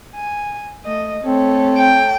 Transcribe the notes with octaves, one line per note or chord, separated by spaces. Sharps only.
G#5
A3 D#5
A3 C4 A4 C#5
G5